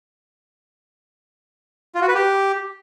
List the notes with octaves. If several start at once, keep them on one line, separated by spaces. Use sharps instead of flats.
F4
F#4
B4
G4